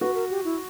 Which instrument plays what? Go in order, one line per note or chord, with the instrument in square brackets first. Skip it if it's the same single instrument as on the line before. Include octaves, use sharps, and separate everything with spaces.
[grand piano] F#4 [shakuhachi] B4
[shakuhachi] A#4
G4
E4